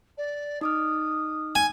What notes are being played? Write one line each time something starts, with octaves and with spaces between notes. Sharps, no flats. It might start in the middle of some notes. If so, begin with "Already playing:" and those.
D5
D#4 D6 D#6 F6
G#5